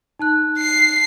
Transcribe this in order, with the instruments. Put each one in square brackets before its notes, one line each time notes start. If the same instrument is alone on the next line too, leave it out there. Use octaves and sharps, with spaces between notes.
[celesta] D#4 A5 F#6
[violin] C7